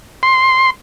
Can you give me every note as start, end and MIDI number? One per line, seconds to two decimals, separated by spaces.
0.23 0.70 84